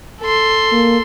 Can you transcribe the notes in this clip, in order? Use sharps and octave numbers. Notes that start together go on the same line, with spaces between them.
A4 C6
A#3